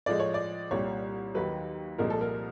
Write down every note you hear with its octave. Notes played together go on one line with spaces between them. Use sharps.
A2 F3 G#3 D5
C#5
D5
C2 A#2 G3 C#5
D#2 D#3 F#3 B4
C2 A#2 F3 G#3 A#4
A4
A#4